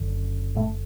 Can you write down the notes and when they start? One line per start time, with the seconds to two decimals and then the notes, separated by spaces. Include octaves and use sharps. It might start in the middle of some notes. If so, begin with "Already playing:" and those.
Already playing: F#1 F#2 D3
0.55 A2 A3